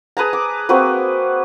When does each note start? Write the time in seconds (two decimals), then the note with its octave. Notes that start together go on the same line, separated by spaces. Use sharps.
0.17 G#4 B4 A5 A#5
0.33 D6
0.69 A#3 C4 F#4 B4